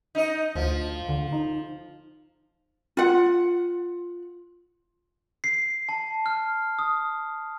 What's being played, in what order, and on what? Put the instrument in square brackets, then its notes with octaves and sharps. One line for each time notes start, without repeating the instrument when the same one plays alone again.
[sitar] D#4 D#5
[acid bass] D2 [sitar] F3
[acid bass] D3
D#4
[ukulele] F4 F#5
[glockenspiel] C7
A5
F6
D#6